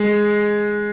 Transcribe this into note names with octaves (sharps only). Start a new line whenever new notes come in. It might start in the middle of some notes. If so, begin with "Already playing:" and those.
Already playing: G#3